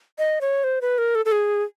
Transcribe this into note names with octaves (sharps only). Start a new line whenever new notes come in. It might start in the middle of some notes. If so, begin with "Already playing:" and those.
D#5
C#5
C5
B4
A#4
A4
A4
G#4